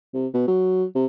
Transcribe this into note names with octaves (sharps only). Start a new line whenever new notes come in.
C3
B2
F#3
C3